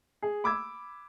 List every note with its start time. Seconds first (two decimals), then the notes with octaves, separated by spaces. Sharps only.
0.22 G#4
0.44 B5 D6 E6 G#6